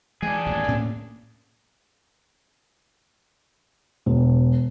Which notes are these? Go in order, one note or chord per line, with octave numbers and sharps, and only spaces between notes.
E3 G#3 D4 G#4
D#1 A1 F#2
A2 A#3 C#4
E1